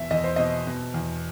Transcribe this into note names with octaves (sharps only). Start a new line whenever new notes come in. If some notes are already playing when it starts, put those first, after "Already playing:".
Already playing: E2 B2 E5
E2 D#5
C5
B2 D#5
B2
E2